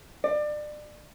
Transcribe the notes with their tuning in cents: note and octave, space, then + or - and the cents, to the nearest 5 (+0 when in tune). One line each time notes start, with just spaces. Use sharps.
D5 +30